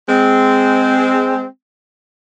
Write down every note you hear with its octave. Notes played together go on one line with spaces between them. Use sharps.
G#3 C4